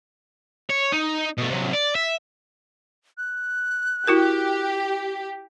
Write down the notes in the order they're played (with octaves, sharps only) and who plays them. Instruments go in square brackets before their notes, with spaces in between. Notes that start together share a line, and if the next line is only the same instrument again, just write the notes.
[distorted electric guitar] C#5
D#4
B2 A3
C3 F#3
D5
E5
[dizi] F#6
[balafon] E4 F#4 A#4 [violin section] G4